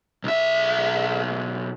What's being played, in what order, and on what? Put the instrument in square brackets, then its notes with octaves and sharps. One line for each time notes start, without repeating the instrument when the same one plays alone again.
[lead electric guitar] B1 E5